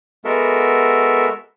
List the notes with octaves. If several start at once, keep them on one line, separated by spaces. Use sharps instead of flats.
G#3 B3 F#4 A4 A#4 E5